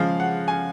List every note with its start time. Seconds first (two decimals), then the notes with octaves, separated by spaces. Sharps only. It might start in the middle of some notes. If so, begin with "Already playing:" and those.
Already playing: C#3 F3 G#3 F5
0.20 F#5
0.48 G#5